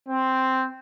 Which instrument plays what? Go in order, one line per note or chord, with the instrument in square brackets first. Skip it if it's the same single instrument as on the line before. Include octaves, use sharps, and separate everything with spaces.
[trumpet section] C4